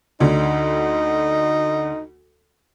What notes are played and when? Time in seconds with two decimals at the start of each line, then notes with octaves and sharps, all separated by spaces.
0.20 D2 D3 D#4